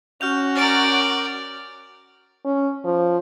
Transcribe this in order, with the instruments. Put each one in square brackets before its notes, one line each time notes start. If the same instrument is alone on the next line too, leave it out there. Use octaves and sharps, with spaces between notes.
[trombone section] C#4 [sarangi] F#4 [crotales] F6 G6 F7
[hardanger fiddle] A#4 D5 [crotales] F6 D7
[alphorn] C#4
F3